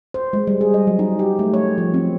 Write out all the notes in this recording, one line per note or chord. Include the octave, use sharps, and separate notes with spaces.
C5
G#3
G3
G#4
D#5
F#3
D#4
G4
A3
C#5
F3
C4